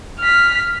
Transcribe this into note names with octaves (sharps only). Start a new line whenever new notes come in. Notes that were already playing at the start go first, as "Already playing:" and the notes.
F6 B6